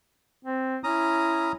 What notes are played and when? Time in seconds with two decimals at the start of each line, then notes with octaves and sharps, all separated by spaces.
0.45 C4
0.84 C#4 E4 A#5 D#6